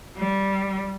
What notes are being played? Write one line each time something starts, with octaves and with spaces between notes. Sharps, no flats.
G3